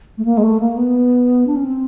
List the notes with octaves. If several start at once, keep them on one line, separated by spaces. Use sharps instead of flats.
A3
A#3
G#3
A3
A#3
B3
D4
C#4
C4